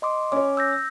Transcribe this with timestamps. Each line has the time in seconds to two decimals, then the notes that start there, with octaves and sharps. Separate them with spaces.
0.02 D#5 C6 D6
0.32 C#4 C#5 D6
0.57 E6 G6 A#6